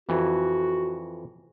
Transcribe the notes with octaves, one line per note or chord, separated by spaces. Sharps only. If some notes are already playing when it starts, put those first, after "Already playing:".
F2 E3 F#4